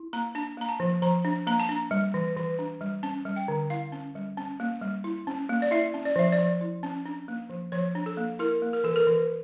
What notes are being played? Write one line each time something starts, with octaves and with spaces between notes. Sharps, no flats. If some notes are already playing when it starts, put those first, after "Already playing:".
Already playing: E4
A#3 A#5
D4 A5
A#3 A#5
A5
F3
F3 A#5
D4
A#3 A#5
A5
D4 A#5
G3
E3
E3
D4
G3
C#4 A5
G3
G5
D3
E4 F5
C#4
G3
C#4
A#3
G3
E4
C#4
A#3
D5
E4 E5
C#4
D5
F3 E5
D5
F3
E4
C#4
D4
A#3
F3
F3 C#5
D4
A4
A#3
E4 A#4
A#3
A#4
E3 A4
A#4
E3